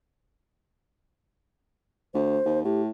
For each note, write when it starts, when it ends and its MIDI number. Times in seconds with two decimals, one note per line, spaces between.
2.14 2.39 38
2.14 2.60 72
2.45 2.60 39
2.64 2.88 45
2.64 2.82 67